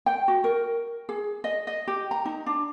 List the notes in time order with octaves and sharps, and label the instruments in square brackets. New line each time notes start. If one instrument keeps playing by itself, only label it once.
[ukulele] G5
F#4
A#4
G#4
D#5
D#5
G4
A#5
D#4
D4